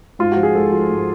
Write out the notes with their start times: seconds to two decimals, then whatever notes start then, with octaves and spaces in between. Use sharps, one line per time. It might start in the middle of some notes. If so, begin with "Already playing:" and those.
0.19 G#2 F4
0.32 F3 F#4
0.43 G#4
0.55 G#2 A4
0.72 F3
0.90 G#2